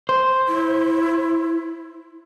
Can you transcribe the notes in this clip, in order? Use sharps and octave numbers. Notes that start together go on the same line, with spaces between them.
C5
E4